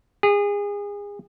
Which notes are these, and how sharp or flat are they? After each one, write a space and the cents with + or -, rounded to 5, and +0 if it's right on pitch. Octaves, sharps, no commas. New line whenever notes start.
G#4 -30